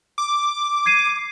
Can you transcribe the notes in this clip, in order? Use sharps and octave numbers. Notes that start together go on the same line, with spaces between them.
D6
G#6 C7 D#7